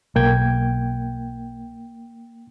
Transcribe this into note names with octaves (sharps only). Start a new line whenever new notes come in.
B1 A#3 G5 G#6